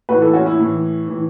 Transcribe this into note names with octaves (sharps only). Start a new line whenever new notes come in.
A2 E3 F#4 B4
E4 A4
C#4 F#4
E4
A2 E3
A2 E3